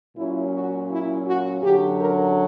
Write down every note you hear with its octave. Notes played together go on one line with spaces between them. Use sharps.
A#2 F#3 C#4 E4
F#4
E4
F#4
F#2 D3 F#3 G4
A#4